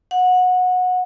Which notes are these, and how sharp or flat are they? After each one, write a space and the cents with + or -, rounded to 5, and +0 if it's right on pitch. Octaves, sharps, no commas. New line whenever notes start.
F#5 -20